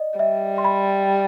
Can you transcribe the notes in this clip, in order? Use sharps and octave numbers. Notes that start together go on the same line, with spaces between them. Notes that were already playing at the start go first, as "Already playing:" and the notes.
Already playing: D5 D#5
G3 E5
C6
B5